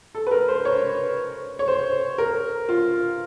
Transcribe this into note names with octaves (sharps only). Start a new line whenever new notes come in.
A4
B4
A#4
C5
C#5
C#5
C5
A#4
F4